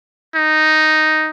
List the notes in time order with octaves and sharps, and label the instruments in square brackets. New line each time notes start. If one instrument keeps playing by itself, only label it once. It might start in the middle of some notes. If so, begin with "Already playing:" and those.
[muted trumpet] D#4